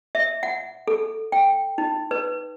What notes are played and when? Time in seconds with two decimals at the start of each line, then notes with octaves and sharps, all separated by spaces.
0.15 E5
0.43 F#5
0.88 A4
1.32 G5
1.78 D#4
2.11 B4